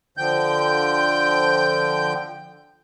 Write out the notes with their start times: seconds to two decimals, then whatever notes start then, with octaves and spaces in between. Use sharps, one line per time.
0.17 D3 F3 G5 G6